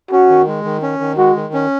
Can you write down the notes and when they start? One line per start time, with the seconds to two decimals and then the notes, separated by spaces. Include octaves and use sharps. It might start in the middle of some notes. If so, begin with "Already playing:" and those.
0.11 C#4 F#4
0.30 D#3
0.47 G#3
0.64 D#3
0.82 C#4
1.01 D#3
1.18 G#3 F#4
1.36 D#3
1.54 C#4